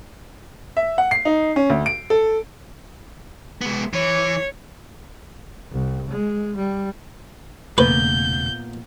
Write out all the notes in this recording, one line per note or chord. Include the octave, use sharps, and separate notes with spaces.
E5
F#5
C7
D#4
C#4
D2
D7
A4
G#3 B3
E3 C#5
C2
G#3
G3
E1 A#2 C#3 A3 B3 B4 G6